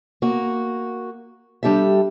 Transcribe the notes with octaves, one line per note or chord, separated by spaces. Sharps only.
A#3 F#4
G3 D4 G4 A4 E5